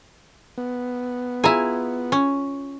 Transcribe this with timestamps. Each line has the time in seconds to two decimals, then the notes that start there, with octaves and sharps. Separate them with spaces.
0.58 B3
1.44 E4 F4 G#4 G#5 A#5
2.12 C#4